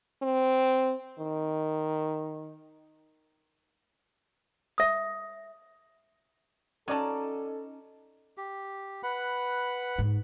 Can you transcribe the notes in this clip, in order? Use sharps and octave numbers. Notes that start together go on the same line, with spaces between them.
C4
D#3
E5 D#6
F#3 C#4 D#4 A4 D5 A5
G4
B4 F#5 B5
G#2